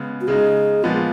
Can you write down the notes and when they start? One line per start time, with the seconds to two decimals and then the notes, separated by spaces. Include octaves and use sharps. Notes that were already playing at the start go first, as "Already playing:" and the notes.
Already playing: C#3 G#3 B3
0.21 F#4
0.27 C#3 G#3 D#4 G#4
0.83 A#2 F3 G#3 B3 F4